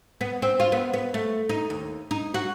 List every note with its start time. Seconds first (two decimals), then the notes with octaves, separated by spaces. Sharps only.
0.21 B3
0.42 C4
0.60 F4
0.72 B3
0.93 B3
1.14 A3
1.49 D#4
1.70 D#2
2.11 D#4
2.34 F#4